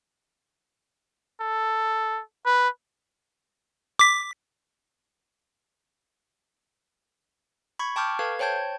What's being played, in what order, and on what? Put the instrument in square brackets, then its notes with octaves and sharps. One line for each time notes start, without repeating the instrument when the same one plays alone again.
[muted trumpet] A4
B4
[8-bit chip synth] D6 B6
[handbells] B5 C#6 G#6
G5 A5 C#6 D6 F6 G6
A4 B4 F5 G#6
C5 C#5 G5 A5 G6 G#6